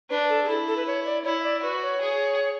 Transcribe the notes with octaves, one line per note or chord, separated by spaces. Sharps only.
D4 B4
A4
G#4
E4 A4
A4
B4
C#5
D5
E4 C#5
E5
D5
F#4 B4
C#5
G#4